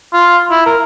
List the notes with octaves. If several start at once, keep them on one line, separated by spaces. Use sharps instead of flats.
F4
E4
A#4